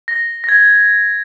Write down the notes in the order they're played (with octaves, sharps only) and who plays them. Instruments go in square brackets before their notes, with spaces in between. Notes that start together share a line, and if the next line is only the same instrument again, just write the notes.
[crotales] A#6
A#6
G#6